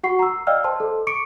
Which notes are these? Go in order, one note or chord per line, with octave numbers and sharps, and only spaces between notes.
F#4 F#5 C#6 C7
A#5 E6
D5 D#5 F5 G5 E6 F6
C5 A5 C6
A4
C#6 D6 C#7 D7